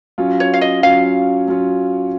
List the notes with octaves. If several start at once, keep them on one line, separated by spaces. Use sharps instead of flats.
F#3 C#4 F4
C#5
F5
D#5
F#3 C#4 F4 F5
F#3 C#4 F4